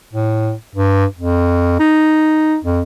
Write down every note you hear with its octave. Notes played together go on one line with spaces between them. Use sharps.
A2
G2
F2
D#4
F2